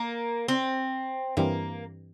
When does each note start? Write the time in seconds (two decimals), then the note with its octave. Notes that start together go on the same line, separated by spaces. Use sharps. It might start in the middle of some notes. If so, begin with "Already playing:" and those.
Already playing: A#3
0.48 C4
1.37 G2 E3 G3 A#3 C4